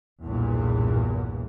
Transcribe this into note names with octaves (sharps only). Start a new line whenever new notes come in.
B1 E2 G2 A#2